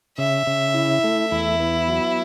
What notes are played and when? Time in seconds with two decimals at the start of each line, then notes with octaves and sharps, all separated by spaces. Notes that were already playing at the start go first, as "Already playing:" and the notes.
0.18 C#3 E5
0.47 C#3
0.74 E4
1.04 A3
1.31 E2 E4
1.60 B3
1.88 F#3